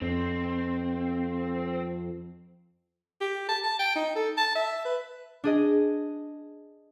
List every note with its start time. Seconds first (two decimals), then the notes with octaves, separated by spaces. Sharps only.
0.02 F2 C4
3.21 G4
3.48 A5
3.63 A5
3.79 G5
3.95 D#4
4.15 A4
4.37 A5
4.55 E5
4.85 B4
5.44 D4 G#4 D#5